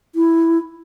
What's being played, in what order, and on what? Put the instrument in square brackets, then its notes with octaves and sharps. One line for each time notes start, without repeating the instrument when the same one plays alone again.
[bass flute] E4